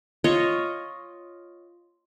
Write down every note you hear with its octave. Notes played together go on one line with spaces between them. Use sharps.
F4 C#5 D#5